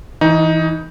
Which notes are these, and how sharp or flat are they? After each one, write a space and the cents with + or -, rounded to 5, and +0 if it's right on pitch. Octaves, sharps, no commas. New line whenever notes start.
E3 -15 D#4 +15